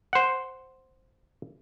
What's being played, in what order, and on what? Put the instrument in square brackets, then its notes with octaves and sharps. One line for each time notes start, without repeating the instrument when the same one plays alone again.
[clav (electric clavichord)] C5 F#5